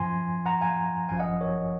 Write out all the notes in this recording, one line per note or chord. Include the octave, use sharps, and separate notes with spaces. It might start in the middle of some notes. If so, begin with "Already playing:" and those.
Already playing: F#2 F3 G#5 C6
F#5 A#5
F5 G#5
G#1 F#2 F3 F5 G#5
D#5 F#5
A#4 C#5